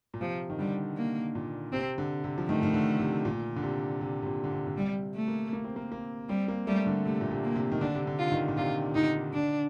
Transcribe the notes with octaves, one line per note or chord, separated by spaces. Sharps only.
A#2
C3 F3
D#3
D3 G3
A#3
A#2
C3 C4
D3
C3
F3
D#3 A3
D#3
D3
C3
A#2
D3
C3
C3
C3
A#2
D3
C3
D3
C3 G3
A3
A#3
A#3
C4
A#3
A#3
G3 C4
A#3
G3 A3
D3
C3 A3
A#2
C3
A#3
C3
D#3
D3 D4
C3
D3
F4
D#3
A#2
C3 F4
D3 D#4
D3 D4